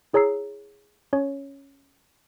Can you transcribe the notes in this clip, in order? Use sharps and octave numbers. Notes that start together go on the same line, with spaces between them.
E4 G#4 C#5 A#5 E6 C7
C#4 C#5